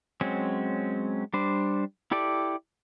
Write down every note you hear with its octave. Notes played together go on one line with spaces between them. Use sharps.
F#3 G#3 C4 C#4
G3 D4 C5
E4 G4 A4 D5